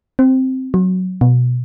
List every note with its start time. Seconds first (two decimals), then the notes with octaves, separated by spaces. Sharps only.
0.19 C4
0.74 F#3
1.21 B2